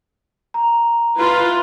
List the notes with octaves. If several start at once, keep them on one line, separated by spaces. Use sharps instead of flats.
A#5
E4 F4 B4